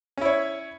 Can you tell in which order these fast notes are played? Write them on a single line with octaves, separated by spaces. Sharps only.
C#4 E4 C#5